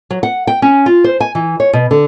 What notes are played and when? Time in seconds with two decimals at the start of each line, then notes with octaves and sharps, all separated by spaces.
0.10 F#3
0.23 F#5
0.47 G5
0.62 C#4
0.86 F4
1.04 C5
1.20 G#5
1.35 E3
1.60 C#5
1.73 B2
1.91 D3